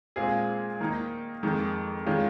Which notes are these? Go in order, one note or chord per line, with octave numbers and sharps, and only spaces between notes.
A#2 G#3 C4 F4 G#4
D#3 A#3 D#4
F2 D#3 G#3
D#3 G#3 C#4 F4